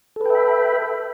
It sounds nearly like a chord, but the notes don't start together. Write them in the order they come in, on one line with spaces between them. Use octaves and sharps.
A4 B4 G5 E5 B5